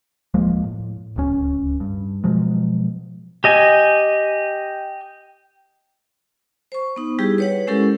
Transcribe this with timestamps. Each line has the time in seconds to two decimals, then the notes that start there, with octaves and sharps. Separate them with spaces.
0.34 D1 F3 G#3 A#3
0.64 A2
1.16 D1 C#2 D#3 C#4
1.80 G2
2.24 B2 F3 F#3 G#3
3.44 G4 D#5 G#5
6.72 C5 C#6
6.96 B3 D#4
7.19 G3 E4 G4 G#4
7.38 B4 C#5 F#5
7.67 G#3 C#4 E4 G4 A4 A#4